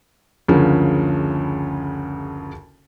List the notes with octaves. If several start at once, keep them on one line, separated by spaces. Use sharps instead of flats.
F#1 D2 C#3 F3